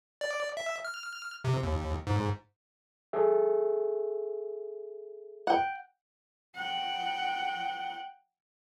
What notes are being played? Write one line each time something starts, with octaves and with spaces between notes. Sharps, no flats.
D5
E5
F6
C3
D#2
G#2
G#4 A4 E5
F#5 G5
F#5 G5